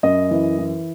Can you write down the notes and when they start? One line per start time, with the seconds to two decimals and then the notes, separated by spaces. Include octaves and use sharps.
0.03 F#2 D#5
0.31 E3
0.59 E3